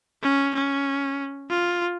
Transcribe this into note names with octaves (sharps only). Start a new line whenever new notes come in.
C#4
C#4
F4